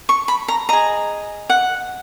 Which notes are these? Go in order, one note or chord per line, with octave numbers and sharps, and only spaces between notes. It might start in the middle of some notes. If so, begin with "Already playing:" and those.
C#6
B5
A#5
G#4 D#5 A#5
F#5